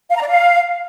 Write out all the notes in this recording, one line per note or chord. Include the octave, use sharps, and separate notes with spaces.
F5
A#5
D5
F5